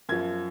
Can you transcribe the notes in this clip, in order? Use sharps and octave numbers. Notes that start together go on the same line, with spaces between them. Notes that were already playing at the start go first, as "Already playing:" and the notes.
F#2 F3 G#6